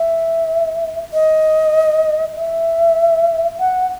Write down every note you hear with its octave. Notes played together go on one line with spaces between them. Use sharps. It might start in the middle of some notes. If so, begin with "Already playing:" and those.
Already playing: E5
D#5
E5
F#5